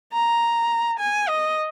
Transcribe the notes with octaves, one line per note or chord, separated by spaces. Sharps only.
A#5
G#5
D#5